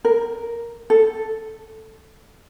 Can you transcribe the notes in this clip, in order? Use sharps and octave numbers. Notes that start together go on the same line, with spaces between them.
A#4
A4